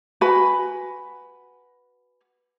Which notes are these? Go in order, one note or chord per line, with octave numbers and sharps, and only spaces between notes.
F#4 B4 G#5 B5